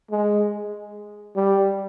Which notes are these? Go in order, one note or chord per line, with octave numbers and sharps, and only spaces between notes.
G#3
G3